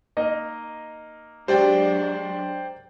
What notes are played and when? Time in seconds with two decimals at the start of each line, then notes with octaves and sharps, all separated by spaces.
0.17 A#3 D#4 D#5
1.48 F#3 G#3 D4 G4 C5 D5 G5